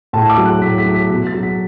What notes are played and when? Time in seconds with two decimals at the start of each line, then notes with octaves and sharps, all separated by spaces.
0.13 A2 A5
0.30 D6
0.38 F#3
0.45 F#6
0.62 A2 B6
0.78 B6
0.86 F#3
0.94 B6
1.10 B2 B6
1.27 A6
1.34 F#3
1.43 B6